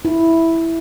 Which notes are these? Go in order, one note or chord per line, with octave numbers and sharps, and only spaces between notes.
E4